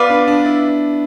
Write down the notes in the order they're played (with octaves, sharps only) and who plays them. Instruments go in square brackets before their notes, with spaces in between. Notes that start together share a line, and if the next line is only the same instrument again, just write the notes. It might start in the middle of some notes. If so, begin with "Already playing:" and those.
Already playing: [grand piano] B3 [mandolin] F4 B4 D5
[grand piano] D4
D4
E4